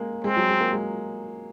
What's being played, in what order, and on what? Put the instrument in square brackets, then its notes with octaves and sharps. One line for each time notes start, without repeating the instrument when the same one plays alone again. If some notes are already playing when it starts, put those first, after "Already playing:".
Already playing: [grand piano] G#3 A#3
[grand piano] G#3 [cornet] C4
[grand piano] F#3
G#3
A#3
G#3